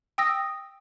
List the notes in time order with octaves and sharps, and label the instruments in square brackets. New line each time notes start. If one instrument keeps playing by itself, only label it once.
[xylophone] G5 D#6 E6 A#6